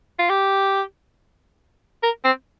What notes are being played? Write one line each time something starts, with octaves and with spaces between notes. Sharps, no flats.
F4
G4
A#4
C4